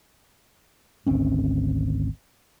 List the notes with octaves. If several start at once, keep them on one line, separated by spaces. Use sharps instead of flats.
G#1 D2 C4 C#4